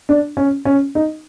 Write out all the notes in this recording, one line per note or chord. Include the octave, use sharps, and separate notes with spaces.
D4
C#4
C#4
D#4